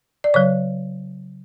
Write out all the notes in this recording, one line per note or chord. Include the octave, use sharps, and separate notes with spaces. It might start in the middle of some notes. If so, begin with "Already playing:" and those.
D5
C#3 F#3 C#5